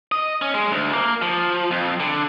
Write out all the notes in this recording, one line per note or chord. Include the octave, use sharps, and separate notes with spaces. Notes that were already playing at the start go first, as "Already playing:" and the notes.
D#5
C#4
G#3
D2
A#3
F3
F2
D3